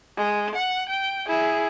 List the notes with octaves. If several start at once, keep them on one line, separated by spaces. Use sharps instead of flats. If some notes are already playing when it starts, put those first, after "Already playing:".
G#3
F#5
G5
E4 G#4